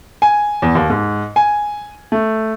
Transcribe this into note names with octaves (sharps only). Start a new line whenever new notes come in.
G#5
E2
D#2
G#2
G#5
A3